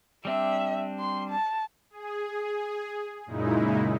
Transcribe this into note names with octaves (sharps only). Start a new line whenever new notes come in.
G3 C4 D4 E5
C6
A5
G#4
F#2 A#2 C#3 G#3 D#4 E4